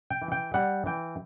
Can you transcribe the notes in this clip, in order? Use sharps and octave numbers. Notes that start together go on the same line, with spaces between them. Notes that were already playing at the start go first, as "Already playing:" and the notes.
G5
E3
G5
G3 F#5
E3 G5